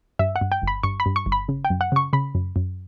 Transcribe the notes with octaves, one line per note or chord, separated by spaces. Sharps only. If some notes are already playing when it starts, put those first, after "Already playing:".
G2 E5
F#5
G2
G5
G1
B5
G2 C#6
B5
G2
C#6
G1
B5
C#3
G5
F#2
F#5
C#3 C#6
C#3 B5
F#2
F#2